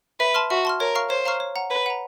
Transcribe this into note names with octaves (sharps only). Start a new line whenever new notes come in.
B4 E5
A5 C6 F6
F#4 E5
A5 C6 F6
A#4 C#5
F5 A#5 C#6 F6
C5 C#5
F5 A#5 C#6 F6
C#5
F#5 A#5
B4 C#5
F#5 A#5